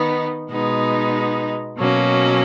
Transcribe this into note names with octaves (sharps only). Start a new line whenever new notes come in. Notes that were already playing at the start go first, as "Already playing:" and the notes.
Already playing: D#3 B3 D#4
B2 G#3 B3 D#4
B2 F#3 A#3 C#4